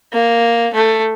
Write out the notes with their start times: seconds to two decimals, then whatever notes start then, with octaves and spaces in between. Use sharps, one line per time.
0.13 A#3
0.73 A3